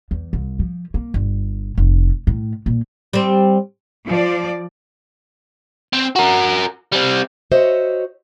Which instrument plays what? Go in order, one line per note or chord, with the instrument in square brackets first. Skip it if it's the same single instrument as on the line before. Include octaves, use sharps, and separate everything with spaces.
[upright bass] E2
C2
F3
A#3
G1
F1
A2
A#2
[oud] G3 C4
[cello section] F3 D5
[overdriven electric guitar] C4
F#4 A#4
G3 C4
[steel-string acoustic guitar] F#4 C5 C#5 D#5 E5